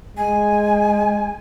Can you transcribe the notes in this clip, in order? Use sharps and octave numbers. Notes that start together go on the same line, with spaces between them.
G#3 G#5